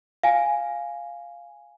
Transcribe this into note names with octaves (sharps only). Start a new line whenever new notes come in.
F5 G#5